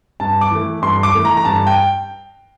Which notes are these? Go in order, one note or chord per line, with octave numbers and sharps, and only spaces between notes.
G2 A5
D6
E3 A3
G2 C6
D6
E3 A3
A#5
A#5
G2 A5
G5